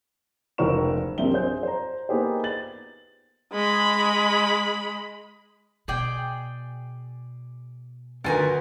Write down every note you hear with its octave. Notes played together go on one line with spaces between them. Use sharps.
F1 C#2 A#4 C5 C#6 E7
A#1 F#2 C3 C4 A#4 G7
G#4 C5 G6
C5 A#5
A#3 B3 D#4 G4 G#4 C5
A6 F#7
G#3 B5
B2 G#4 D5 G5
D2 D#3 F4 B4 G#5 A#5